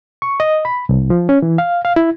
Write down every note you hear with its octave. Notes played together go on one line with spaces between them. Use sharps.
C#6
D#5
B5
C2
F3
C#4
E3
F5
F5
E4